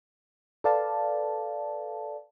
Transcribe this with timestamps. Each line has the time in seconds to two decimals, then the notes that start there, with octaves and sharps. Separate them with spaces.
0.64 A4 B4 D5 F5 A5